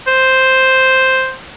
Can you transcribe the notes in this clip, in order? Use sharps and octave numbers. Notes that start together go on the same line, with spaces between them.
C5